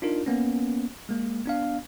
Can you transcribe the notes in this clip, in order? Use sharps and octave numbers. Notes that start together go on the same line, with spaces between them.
D4 D#4 F4 A#4
A#3 B3 C#4
G#3 A#3
B3 D4 F5